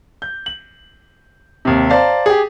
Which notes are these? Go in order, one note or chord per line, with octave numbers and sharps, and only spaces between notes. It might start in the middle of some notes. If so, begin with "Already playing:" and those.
G6
F#7
D#2 C3
C5 D5 F5 A5 A#5
G4 G#4